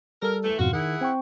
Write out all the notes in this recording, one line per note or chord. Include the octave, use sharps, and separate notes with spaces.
G3 A4 A#4
E3 A3
F2 G#2 B2 F4 F#4
D#3 E4 G#4 F#5
C4 G5 C#6